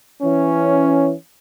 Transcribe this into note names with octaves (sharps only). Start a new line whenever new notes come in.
E3 C#4